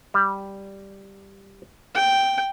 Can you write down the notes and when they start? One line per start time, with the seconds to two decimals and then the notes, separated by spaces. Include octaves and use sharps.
0.14 G3
1.95 G5